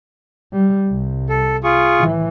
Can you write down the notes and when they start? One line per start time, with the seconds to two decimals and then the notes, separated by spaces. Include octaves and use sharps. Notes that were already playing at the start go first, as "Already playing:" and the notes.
0.52 G3
0.88 C2
1.29 A4
1.64 F4 G#4 C#6
1.98 A2 E3